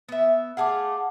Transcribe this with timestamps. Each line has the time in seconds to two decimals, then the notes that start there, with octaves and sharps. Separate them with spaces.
0.09 B3 E5
0.57 A3 G#4 F5 F#5 A5 D6